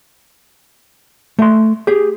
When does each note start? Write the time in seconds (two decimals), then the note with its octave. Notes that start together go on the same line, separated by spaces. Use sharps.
1.39 A3 C6
1.87 G4 G#4